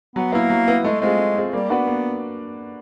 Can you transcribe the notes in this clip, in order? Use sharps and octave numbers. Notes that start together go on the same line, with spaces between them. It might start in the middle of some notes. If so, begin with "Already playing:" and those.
F#3 B3
A#3 B3 E4
F#3
B3 E4
G#3 A3
G#3 C4 F4 G#4
A3
C4 F4 G#4
G3 A#3
B3 D4 F#4 B4 D5
A#3